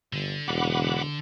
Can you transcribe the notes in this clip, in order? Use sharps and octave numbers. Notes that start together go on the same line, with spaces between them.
G1 D3
E1 F#5 B5 D6